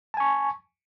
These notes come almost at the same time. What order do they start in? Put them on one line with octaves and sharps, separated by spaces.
A5 G#5 C#6